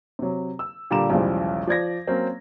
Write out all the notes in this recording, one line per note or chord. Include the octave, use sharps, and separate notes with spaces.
C3 F#3
E6
A#2 D3 G3 A#5 D6 E7
B1 E2 C#3 F3 G3 G#3
F3 D5 G#6 A#6
F#3 A#3 C4 C#4